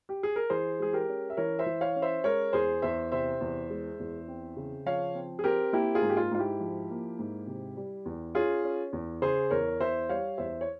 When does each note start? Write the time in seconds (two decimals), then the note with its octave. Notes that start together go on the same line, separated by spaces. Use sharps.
0.09 G4
0.23 G#4
0.36 A#4
0.50 E3 G#4 C5
0.80 G#3 G#4
0.93 G4 A#4
1.08 C#4
1.30 E5
1.37 E3 A#4 C#5
1.59 C5 E5
1.66 E3
1.81 C#5 F5
1.96 C#4
2.02 C5 E5
2.24 G#3 A#4 C#5
2.53 E2 G#4 C5
2.82 E2 C5 E5
3.12 C3 C5 E5
3.41 E2
3.70 G#3
3.99 E2
4.28 C4
4.57 C#3
4.86 F3 C#5 F5
5.15 C4
5.39 G#4
5.44 C4 G4 A#4
5.73 A#3 E4 G4
5.95 F4 G#4
6.02 G#2
6.09 G4
6.17 F4
6.31 G#2 F4
6.39 E4 G4
6.60 F3
6.90 A#3
7.19 G#2
7.47 C3
7.77 G3
8.05 E2
8.35 C#4 F4 G#4
8.64 C#4
8.93 E2
9.22 C#3 G#4 C5
9.51 E2 A#4 C#5
9.80 E2 C5 E5
10.09 G3 C#5 F5
10.38 E2 C5 E5
10.61 C#5